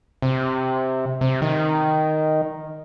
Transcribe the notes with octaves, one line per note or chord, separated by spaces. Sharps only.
C3
C3
D#3